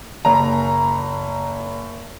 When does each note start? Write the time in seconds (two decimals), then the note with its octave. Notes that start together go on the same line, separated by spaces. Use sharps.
0.25 F#1 A#5